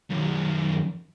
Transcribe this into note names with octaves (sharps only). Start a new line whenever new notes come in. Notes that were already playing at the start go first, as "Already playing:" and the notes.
F#2 D#3